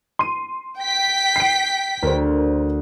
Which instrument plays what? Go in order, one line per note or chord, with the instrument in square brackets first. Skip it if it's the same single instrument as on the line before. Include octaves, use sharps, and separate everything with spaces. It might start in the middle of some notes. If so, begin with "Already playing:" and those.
[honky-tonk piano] C6 D#7
[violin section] G5 B6
[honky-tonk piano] C7 D7
[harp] D2 [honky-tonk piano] A#4 C5